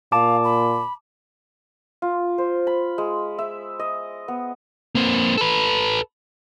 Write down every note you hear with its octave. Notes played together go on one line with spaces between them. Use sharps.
A#2 F5 A5 D6
B5
F4
C5
B5
G#3
E5
D#5
B3
A#3 C4
A4 B4